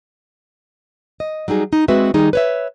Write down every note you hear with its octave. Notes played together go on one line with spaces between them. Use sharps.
D#5
F#3 G3 D#4 G#4
D#4
G#3 C4 F#4 G#4 B4 E5
D#3 G3 D#4 G#4
B4 C#5 E5